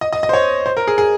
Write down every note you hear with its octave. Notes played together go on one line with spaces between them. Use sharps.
D#5
D#5
D#5
C5
C#5
C5
A#4
G#4
G#4